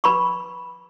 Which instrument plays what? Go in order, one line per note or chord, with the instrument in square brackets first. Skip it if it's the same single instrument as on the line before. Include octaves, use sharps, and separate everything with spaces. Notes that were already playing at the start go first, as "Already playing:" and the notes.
[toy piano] B4 B5 C#6